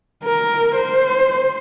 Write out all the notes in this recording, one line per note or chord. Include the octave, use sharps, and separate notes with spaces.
A#4
C5